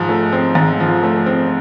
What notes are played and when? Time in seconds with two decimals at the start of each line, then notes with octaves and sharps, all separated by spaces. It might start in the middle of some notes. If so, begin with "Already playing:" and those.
Already playing: G#2 F3
0.09 A3
0.32 C4
0.55 G#2
0.80 F3
1.03 A3
1.26 C4